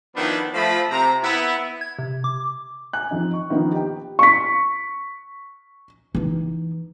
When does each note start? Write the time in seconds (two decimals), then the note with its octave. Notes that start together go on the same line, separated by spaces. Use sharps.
0.15 D#3 F3 B3 D4 E4 B4
0.54 F3 A3 B5
0.90 C3 A#5
1.23 B3 E4
1.81 G#6
1.99 C3
2.24 D6
2.93 G#5 F#6
3.11 F2 D#4
3.34 C#6
3.50 D#3 F3 A#3 B3 D4 D#4
3.72 G4 G5
4.19 C#6 B6
6.15 E3 D#4